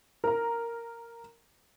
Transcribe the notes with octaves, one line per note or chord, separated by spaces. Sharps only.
A#4 A#5